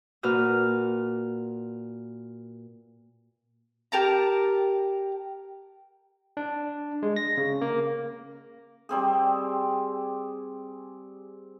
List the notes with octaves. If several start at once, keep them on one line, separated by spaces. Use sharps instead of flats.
A#2 F#4 B4 F6
G4 A#4 A5 A#5
D4
G#3
A#6
C#3
A#3
G3 C4 G#4